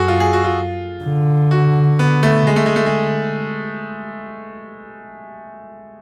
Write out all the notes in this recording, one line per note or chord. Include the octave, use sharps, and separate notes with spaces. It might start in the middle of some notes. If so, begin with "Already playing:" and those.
Already playing: F#2 F#4 G#4 A4
F4
G#4
F#4
F4
D3
F#4
B3
A3
D3 G#3
A3
G#3
A3
G#3